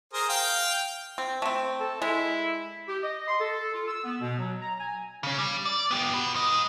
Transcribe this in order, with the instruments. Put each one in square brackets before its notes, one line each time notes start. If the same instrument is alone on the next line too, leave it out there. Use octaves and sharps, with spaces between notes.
[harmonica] G#4 A#4 C5
F5 G5
[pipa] C4
A3 C4
[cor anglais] A4
[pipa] G#3 [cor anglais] E4
[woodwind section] G4
D#5
C6
A4
F4
E6
B3
B2
F#3
A#5
G#5
[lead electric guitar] C#3 C#4
G3
D5
B3 G4
F#4 B4
G#2 D#5